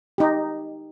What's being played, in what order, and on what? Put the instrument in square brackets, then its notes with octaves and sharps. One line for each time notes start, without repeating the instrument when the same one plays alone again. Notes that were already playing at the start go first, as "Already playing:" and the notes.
[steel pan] D#4 G4